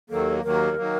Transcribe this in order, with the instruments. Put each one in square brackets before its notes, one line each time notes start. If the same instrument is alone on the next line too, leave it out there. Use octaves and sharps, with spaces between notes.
[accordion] D#2 D#3 F#3 A#3 [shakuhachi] A4
[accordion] D#2 D#3 F#3 A#3 [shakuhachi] A#4
[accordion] D#3 F#3 A#3